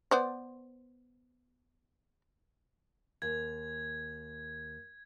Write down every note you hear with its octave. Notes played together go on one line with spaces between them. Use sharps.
B3 C5 D5
D#2 G#6